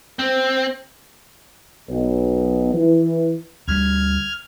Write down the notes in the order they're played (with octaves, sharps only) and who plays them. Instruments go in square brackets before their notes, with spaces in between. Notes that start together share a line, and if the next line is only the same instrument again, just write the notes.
[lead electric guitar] C4
[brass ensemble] B1
E3
[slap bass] D2 G3 [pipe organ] F6 G#6